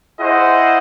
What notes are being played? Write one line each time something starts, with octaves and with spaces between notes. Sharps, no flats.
E4 G#4 C5 D#5 F#5